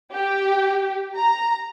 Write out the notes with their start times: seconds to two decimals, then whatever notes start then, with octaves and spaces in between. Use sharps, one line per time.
0.14 G4
1.18 A#5